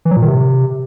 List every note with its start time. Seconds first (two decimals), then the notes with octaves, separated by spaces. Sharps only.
0.05 E3
0.11 F#3
0.16 A#2
0.22 D#3
0.28 C3